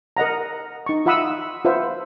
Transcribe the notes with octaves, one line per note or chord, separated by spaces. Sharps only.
A#4 D#5 F#5 A#5
D#4 C#6
F4 E5 F#5 B5 D#6 E6
F4 B4 C5 E5 F#5